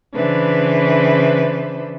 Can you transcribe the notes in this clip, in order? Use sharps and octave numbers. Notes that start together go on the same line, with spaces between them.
C#3 E3 D4 B4 C5